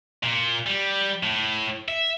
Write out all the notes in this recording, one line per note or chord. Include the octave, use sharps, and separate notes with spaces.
A#2
G3
A2
E5